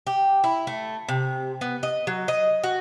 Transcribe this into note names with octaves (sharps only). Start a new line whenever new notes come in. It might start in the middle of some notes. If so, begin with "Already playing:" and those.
G4
E4
A3
C3
B3
D#5
F#3
D#5
F#4